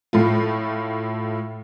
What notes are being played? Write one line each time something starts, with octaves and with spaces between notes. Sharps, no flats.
A2 A3 F4